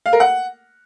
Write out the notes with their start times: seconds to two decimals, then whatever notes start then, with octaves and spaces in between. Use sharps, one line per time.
0.06 F5
0.13 A#4
0.20 F#5